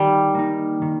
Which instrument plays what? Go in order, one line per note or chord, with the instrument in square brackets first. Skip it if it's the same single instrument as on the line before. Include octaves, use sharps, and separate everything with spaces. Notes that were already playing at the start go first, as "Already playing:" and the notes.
Already playing: [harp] D#3 [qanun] G3
[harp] A#3 D#4
D#3